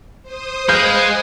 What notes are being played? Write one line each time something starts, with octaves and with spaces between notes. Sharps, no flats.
C5 D#6
G#3 G#4 B4 F5 G6